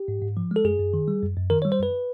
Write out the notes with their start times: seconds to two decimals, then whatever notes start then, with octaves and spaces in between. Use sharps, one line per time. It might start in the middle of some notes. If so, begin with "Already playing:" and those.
Already playing: G4
0.08 G#2
0.22 G#2
0.37 F3
0.51 G#3 A4
0.64 F#2 G#4
0.79 F#2
0.94 D#3
1.08 G3
1.22 F#2
1.37 F#2
1.50 D#3 A#4
1.62 C#5
1.65 G3
1.72 C5
1.79 F#2 B4